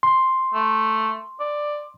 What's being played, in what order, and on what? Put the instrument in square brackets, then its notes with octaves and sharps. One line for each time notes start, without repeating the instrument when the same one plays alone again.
[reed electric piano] C6
[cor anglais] A3
D5